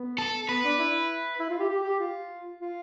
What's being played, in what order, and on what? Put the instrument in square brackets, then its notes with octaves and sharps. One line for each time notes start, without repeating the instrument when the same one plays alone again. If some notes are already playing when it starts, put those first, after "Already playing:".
Already playing: [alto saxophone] B3
[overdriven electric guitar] A4
[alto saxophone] B3 [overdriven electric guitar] B4
[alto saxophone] D4
E4
E4
F4
G4
G4
G4
F4
F4